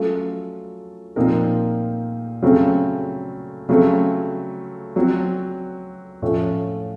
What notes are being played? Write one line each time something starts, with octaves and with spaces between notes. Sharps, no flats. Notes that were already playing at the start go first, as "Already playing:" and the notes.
Already playing: F#3 A3 C#4 F4 A4
A#2 F3 C4 D#4 A#4
C#3 F#3 A3 C4
C#3 F#3 A3 C4
F#3 C4 F#4
A2 F3 A3 C#4